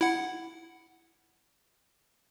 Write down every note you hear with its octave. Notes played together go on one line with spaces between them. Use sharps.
E4 F#5